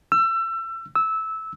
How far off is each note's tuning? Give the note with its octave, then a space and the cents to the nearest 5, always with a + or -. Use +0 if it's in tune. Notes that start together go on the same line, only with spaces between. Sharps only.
E6 +30
E6 -15